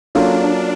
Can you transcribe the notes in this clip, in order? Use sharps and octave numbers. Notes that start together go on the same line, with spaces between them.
F#3 A#3 C#4 D4 F4 A4